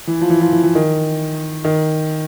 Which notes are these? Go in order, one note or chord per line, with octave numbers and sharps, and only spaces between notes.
E3
F3
E3
F3
E3
E3
D#3
D#3